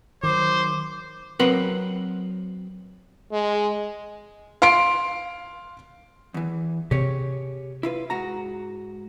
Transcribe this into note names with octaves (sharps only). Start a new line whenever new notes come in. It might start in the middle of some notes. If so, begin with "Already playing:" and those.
D#3 E3 F#3 C5 D6
F#3 C4 A#4 B4 F#5 C6
G#3
F5 C6 D7
E2 E3
C3 C4 G4 G#4 C#5
E4 F4 B4
G#2 F#4 A#5